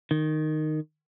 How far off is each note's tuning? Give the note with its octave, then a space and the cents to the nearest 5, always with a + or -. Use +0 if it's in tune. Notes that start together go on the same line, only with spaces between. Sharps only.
D#3 -10